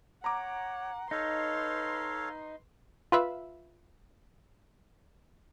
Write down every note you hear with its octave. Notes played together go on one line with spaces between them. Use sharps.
C#5 F#5 A#5 D6
D#4 A4 B4 C#5 F5 C6
F4 B4 E5